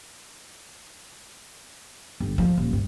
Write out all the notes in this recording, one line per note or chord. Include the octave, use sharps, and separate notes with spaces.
G1
F3
D#1
G2